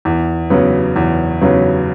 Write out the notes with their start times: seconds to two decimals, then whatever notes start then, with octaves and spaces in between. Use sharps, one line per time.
0.05 E2
0.50 C#3 F#3 B3
0.96 E2
1.41 C#3 F#3 B3